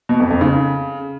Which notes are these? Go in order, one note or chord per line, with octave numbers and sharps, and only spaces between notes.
B2
F2
F2
C#3